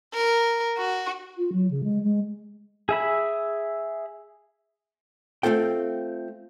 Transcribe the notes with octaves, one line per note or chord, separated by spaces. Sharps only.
A#4
F#4
F4
F#3
C#3
G#3
G#3
G#4 E5 B5
A3 C4 F4 A4 G5